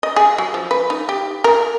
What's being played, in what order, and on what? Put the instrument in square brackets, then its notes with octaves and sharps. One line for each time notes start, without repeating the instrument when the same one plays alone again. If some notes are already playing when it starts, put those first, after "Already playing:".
[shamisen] D#5
G#4
F#3
F3
B4
D#4
G4
A#4